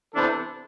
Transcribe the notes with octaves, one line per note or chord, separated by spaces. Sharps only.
C3 E3 B3 D4 A4